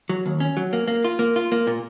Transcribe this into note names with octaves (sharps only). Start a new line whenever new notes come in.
F#3
D#2
C#4
F#3
A#3
A#3
F4
A#3
F4
A#3
A#2